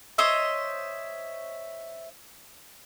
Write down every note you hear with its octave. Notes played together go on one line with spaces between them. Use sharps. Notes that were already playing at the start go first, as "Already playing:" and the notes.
C5 C#5 D#5 E5